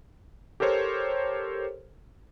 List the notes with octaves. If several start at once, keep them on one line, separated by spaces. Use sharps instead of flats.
G4 A4 A#4 C5 C#5